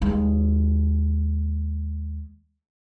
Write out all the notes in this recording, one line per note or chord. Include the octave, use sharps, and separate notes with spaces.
D#2 G#3